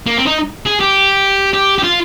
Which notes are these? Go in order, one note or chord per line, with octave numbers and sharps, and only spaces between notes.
A#3
C4
D#4
G#4
G4
G4
G4
F4